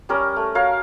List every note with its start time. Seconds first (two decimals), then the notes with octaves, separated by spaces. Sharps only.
0.09 G3 C#4 A#4
0.36 A3
0.55 F#4 A#4 C#5 F5